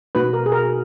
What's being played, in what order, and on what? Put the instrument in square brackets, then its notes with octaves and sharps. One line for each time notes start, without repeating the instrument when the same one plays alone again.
[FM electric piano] B2 A#3 D#4 F#4 [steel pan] B4
[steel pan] A#4
G#4
A#4